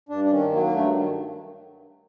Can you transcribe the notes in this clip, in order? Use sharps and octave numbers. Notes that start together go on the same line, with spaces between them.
G2 D4
D4
D#3 C#4
F#3 A#3
A#3
G2 A3
D#3